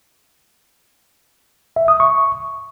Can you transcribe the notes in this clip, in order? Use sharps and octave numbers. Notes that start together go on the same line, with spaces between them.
E5
D#6
C#6